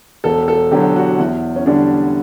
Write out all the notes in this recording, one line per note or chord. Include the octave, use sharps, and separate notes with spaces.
E1 A4
A4
E2 D3 F#3 G4
F#4
E2 E4
C#4
D3 G3 D4